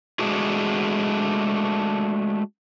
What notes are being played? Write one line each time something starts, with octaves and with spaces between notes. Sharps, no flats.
G#3 A3 D4 F#4 G#4